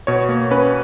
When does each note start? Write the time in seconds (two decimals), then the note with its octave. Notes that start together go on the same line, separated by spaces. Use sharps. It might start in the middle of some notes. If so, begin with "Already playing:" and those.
0.07 B2 C#5
0.29 A#3
0.51 C#4 B4